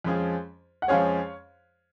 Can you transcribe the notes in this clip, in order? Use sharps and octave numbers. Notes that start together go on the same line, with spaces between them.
F2 F3 G#3 C#4 G#4
F#5
F2 F3 G#3 C#4 G#4 C#5 F5